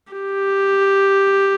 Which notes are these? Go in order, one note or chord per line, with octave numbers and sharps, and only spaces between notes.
G4